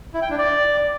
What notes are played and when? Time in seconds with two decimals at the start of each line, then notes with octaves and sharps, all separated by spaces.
0.14 E4
0.22 G5
0.30 D4
0.38 D5